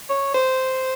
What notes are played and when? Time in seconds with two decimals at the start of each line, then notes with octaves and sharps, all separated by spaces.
0.09 C#5
0.34 C5